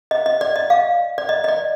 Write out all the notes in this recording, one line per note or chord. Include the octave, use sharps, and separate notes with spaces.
D#5
D#5
D5
D#5
F5
D5
D#5
D#5
D5